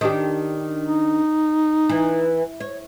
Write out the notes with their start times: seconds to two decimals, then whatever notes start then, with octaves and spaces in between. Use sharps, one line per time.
0.01 D#3 D4 G4
0.87 D#4
1.89 E3
2.60 C#5